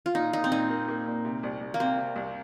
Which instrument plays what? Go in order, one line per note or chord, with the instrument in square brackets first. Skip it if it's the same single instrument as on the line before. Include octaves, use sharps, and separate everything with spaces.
[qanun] F4
[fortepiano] A#2 [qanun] D#4
[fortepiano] A#2 [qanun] D#4
[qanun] C4
[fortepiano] A#2 [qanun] D#4
[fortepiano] A#3
A#3
A#2
C3
C2
C2
[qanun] A#3
[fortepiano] C3 [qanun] C4
[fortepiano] C3
C2